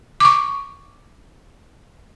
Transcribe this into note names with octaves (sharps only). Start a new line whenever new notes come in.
C#6 D6